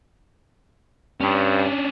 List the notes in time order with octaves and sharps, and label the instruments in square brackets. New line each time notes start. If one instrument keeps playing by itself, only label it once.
[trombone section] G2 [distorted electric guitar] C#4 D4